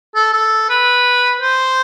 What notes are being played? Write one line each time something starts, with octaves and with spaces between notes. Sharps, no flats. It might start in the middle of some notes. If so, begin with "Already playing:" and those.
A4
A4
B4
C5